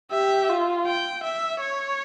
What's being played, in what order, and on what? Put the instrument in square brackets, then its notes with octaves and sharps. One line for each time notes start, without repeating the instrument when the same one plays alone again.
[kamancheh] G4 [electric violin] E5
[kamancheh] F4
[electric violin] G5
E5
C#5